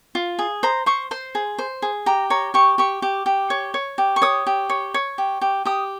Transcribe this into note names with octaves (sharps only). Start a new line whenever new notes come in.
F4
G#4
C5 A#5
C5 C#6
C5 C6
G#4
C5
G#4
G4 A#5
C#5 A#5
G4 C#6
G4 C#6
G4
G4
C#5
C#5
G4
C#6
C#5 D#6
G4
C#5
C#5
G4
G4
G4 D#6